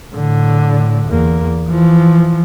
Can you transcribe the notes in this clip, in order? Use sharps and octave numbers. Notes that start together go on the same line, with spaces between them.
A2 D3
E2 A#3
E3 F3